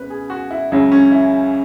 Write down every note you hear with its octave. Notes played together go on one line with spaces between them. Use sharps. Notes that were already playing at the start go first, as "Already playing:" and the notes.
Already playing: C#2 B2 B4
G#4
F#4
E4
C#2 C#3 F#3 E4
C#4
E4